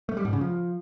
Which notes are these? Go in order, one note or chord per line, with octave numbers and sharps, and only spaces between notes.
A3
G3
G#2
C#3
F3